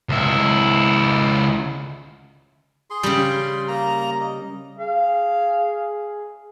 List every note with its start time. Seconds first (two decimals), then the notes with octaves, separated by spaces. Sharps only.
0.09 C#2 E4
2.90 G#4 C6
3.03 C#3 G3
3.68 A#3 A#5
4.21 D#5
4.79 G#4 F5